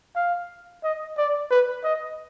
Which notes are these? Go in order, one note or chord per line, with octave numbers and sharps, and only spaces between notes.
F5
D#5
D5
B4
D#5